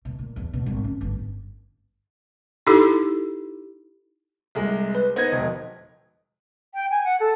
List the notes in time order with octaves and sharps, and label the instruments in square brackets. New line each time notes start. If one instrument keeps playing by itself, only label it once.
[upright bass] B2
A#2
E2
B2
G#1
C#4
G1
[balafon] D#4 E4 G4 A4
[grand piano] C2 G#3
[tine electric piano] B4
[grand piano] B3 D#4 A#6 [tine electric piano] C5 G#6
[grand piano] E1 F2 [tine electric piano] D#5
[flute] G5
G#5
F#5
A4